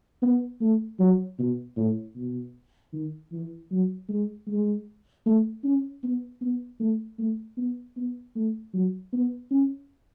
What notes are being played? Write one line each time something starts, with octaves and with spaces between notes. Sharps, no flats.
B3
A3
F#3
B2
A2
B2
D#3
E3
F#3
G#3
G#3
A3
C#4
B3
B3
A3
A3
B3
B3
A3
F#3
B3
C#4